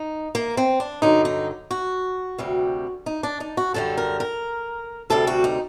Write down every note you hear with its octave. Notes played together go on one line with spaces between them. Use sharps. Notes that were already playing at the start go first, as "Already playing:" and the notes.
Already playing: D#4
A#3
C4
D4
G2 D3 F#3 D#4
D#4
F#4
D2 C3 G3
D#4
D4
D#4
F#4
F#2 D3 G3 A4
A#4
A#4
D2 C3 G3 A4
F#4
D#4